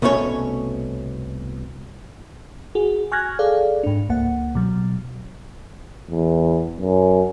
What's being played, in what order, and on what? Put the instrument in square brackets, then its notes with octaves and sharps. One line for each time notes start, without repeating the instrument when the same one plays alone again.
[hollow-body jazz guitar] C2 B2 A3 C#4 A4 C#5
[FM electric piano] F#4 G#4
G#5 C#6 F6 F#6 G#6 A#6
G#4 A4 D5 F5
G#2 D4
C#2 A#3 F#5
B2 F#3
[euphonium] E2
F#2